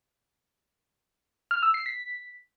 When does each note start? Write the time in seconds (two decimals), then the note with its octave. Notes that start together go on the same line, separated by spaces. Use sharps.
1.51 F6
1.63 E6
1.74 C7
1.86 B6